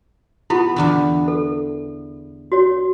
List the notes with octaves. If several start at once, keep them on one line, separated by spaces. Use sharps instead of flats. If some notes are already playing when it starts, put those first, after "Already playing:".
B3 E4 F4 G4
E2 D3 E3
A4
F#4 C#5